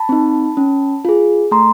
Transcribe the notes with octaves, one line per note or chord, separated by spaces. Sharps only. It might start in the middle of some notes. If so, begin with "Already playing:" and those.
Already playing: A5 B5
C4 D#4
C#4
F4 G#4
A3 A#5 C6